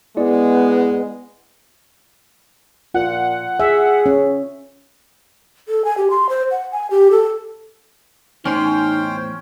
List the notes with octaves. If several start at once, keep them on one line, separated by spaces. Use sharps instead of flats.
G#3 B3 E4 D5
A#2 F4 F#5
G#4 E5
C#4
A4
G#5
G4
C6
C5
F#5
G#5
G4
A4
E2 A2 C#4 D#4 C5 G5 C6